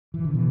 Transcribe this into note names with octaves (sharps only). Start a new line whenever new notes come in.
E3
D3
B2 E3